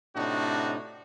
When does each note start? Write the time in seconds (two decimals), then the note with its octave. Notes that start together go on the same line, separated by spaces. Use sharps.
0.15 A2 C3 D4 D#4 F#4